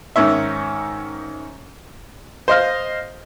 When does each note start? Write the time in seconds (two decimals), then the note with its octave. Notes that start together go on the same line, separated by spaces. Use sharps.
0.16 G#2 D#3 C#4 E5
2.48 C5 D#5 F5